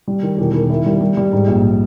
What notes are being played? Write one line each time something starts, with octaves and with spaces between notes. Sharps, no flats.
G3
D#3
E1
D#3
E4
G3
G3
G3
G#2
A#1